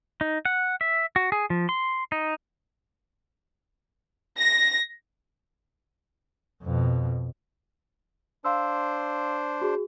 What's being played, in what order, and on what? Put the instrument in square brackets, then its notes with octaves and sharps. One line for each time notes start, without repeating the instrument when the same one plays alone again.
[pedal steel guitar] D#4
F#5
E5
F#4
G#4
F3
C6
D#4
[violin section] A#6
[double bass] F2 B2
[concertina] D4 C5 [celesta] F5 C6 E6
[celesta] F#4 G#4